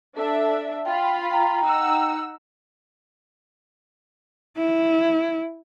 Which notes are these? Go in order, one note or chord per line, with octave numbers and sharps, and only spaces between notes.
D4 A4 E5
F4 F5 G5 B5
G5 A#5
D#4 F#5 E6
E4